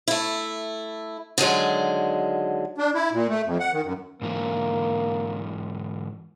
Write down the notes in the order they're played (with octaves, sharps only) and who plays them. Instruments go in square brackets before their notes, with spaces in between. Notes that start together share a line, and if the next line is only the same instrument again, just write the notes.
[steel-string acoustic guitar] A3 E4
D3 D#3 F#3 G#3
[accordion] D4
E4
A#2
A3
F2
F#5
D#3
F#2
[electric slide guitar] G#2 D3 E3 [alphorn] A#3